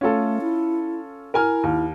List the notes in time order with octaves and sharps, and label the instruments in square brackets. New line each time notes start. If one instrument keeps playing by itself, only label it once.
[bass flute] A3 [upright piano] C#4 F4 A4
[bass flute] E4
[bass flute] E4 [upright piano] A#4 G#5 F6
[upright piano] D#2